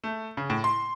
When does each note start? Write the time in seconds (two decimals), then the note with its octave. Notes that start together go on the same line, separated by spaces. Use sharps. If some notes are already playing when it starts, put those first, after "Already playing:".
0.04 A3
0.37 C#3
0.50 A2
0.64 C6